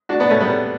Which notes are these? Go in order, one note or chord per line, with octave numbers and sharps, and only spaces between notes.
D4 F#4
B3 D4
A3 C#4
G3 B3